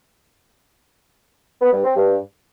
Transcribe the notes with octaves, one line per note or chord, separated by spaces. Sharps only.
B3
G2
C4
G2